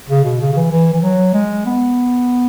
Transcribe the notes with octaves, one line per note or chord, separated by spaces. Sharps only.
C#3
B2
C#3
C#3
E3
E3
E3
F#3
G#3
B3